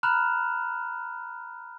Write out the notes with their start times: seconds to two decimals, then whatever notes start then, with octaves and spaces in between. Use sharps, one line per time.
0.03 A#5 B5 F6 F#6 E7 F7